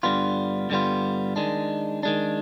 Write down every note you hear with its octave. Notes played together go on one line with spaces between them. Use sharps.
G2 D3 G3 B3 F4
G2 D3 G3 B3 F4
D#3 G#3 D4
D#3 G#3 D4